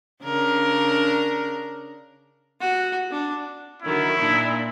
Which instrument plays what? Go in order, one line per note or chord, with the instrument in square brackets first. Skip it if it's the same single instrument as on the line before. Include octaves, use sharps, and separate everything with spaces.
[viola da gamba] C#3 D4 A#4
[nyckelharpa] F#4
D4
[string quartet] D3 D#3 F#3 [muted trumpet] E4
[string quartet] A#2 D4 D#4